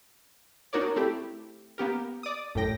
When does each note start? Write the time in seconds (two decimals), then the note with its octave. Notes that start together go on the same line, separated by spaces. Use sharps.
0.73 D4 D#4 F#4 A#4 C#5 D5
0.96 A3 C4 E4 G4
1.78 A#3 B3 G4 A#4
2.23 D5 D#6
2.55 A1 F#2 A2 G5 A#6